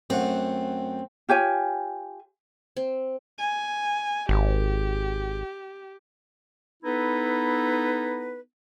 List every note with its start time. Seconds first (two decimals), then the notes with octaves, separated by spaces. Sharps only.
0.10 F#2 A3 C4 F#5
1.29 F4 G4 C#5 G#5
2.77 C4
3.39 G#5
4.29 G#1 G4
6.83 B3 D#4 E4 A4 B4